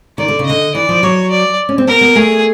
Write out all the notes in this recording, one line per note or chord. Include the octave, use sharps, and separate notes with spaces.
D#3 D5
D3
C#3
D3 D#5
E3 D5
F3
F#3 C#5
D5
C#4
C4
B3 A#4
B3
A3 G#4